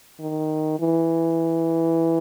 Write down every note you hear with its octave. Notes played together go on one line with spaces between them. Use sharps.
D#3
E3